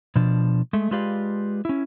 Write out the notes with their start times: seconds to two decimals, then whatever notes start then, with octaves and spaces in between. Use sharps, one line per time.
0.16 B2 F3 D4
0.73 G#3 A3
0.91 G#3 F4 G4 B4 D5 F5
1.65 C#4 E4